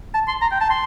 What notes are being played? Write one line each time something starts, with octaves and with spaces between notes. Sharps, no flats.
A5
C6
A#5
G5
A5
C6